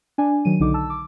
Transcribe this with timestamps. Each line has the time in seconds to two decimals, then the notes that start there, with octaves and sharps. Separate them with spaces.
0.18 D4 G#5
0.45 D#3 F#3 D#7
0.60 B1 D3 D#4 D6
0.74 A5 E6
0.90 D6